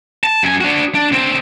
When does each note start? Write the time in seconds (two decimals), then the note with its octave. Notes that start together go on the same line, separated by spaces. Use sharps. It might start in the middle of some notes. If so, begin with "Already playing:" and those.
0.24 A5
0.43 F#2 G#5
0.61 D4 F#4
0.95 D4
1.12 D2 C4